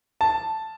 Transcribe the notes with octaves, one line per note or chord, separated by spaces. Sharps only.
A5